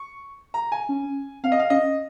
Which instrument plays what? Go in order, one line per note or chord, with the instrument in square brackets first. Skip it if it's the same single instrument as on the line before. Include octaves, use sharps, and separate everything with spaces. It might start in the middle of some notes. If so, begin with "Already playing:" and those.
Already playing: [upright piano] C#6
A#5
G#5
[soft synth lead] C#4
[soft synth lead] C4 [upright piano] F5
[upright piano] D#5
F5
[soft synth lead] C#4 [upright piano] D#5